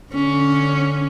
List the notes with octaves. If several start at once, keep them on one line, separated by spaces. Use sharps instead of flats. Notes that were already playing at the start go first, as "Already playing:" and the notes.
D3 C#4